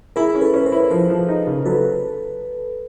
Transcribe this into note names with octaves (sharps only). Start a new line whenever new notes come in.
E4 G#4 A#4
C#4
A4 B4
C#4 B4
A#4 C5
E4
F3 A#4 C5
F3
D#4
C#3
F#3 A4 B4